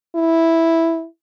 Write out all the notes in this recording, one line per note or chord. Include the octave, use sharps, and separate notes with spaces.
E4